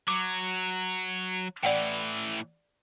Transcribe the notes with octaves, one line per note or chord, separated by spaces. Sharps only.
F#3 D6
A2 E3 D5 F#5 G5